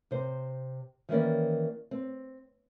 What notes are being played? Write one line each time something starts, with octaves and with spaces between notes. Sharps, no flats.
C3 C5
D#3 E3 A#3 C#4 D5
C4